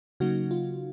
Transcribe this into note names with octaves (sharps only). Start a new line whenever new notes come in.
C#3 F#3 A#3 D#4 F#4
F4